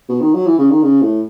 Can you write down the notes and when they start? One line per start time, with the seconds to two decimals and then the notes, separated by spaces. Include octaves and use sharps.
0.09 B2
0.20 D#3
0.34 F#3
0.47 E3
0.59 C#3
0.70 D#3
0.83 C#3
1.02 A2